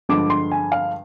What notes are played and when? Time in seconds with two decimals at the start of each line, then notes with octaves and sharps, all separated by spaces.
0.09 G2 D3 F3 G#3 D6
0.30 C6
0.52 G#5
0.72 F5